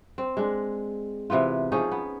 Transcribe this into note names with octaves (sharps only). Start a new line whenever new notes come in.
C4
G#3 D4
C3 E3 B3 F4
F3 C#4 D#4 G#4
B3